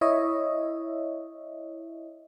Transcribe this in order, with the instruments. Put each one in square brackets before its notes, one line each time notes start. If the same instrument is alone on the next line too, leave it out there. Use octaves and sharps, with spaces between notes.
[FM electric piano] E4 C#5 D#5 E5